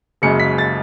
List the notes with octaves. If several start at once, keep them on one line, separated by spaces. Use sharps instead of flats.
F#1 F#2 C#3 G#3 C#7
B6
A6